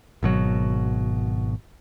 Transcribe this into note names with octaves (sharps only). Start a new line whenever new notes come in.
G#1 B2 F#3